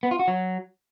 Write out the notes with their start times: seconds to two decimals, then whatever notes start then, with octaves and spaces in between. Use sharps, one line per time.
0.03 B3
0.11 F4
0.19 F#4
0.28 F#3